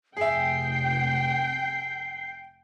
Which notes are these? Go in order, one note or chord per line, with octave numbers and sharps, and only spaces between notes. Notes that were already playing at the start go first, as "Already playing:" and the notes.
F1 G#4 E5 G5 C7